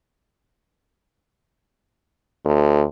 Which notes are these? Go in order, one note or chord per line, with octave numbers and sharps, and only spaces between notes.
D2